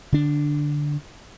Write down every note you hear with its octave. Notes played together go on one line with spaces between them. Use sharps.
D3 D4